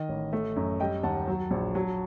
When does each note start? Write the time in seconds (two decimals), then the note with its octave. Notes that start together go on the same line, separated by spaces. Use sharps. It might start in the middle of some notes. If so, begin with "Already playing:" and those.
Already playing: D#3 D#5
0.09 A1
0.33 A3
0.56 F#2
0.80 G3 D#5 G5
1.03 D#2 F#5 A5
1.28 F#3
1.51 A#1
1.75 F#3